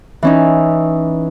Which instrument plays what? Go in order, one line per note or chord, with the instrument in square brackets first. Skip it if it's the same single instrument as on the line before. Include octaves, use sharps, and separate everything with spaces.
[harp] E3 C#4 D#4